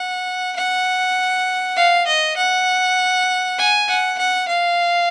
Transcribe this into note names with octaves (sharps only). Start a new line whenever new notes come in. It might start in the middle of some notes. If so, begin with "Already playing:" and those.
Already playing: F#5
F#5
F5
D#5
F#5
G#5
F#5
F#5
F5